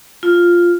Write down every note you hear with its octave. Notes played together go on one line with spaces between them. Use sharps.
F4